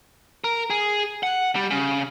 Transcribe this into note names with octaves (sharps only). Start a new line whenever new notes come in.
A#4
G#4
F#5
G3
C#3